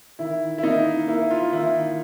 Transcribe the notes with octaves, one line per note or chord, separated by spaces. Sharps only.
D#3 E4
E4
A#3 D#4
A#3 E4
F4
D#3 E4